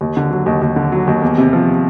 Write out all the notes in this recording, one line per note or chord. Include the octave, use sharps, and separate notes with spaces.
D#2
D3
F#3
D#2
D#2
D3
F#3
D#2
E2
C3
F3